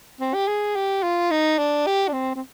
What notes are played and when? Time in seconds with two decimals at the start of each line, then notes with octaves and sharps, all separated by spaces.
0.21 C4
0.34 G4
0.48 G#4
0.76 G4
1.03 F4
1.31 D#4
1.59 D4
1.87 G4
2.08 D4
2.13 C4
2.36 C4